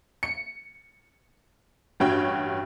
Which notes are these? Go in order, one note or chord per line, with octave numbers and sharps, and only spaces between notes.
C#7
A1 G2 F#4 C#5 G5